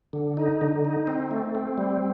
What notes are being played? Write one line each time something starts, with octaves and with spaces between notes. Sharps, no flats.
D3
D#4
D3
D#4
C4
A3
C4
G3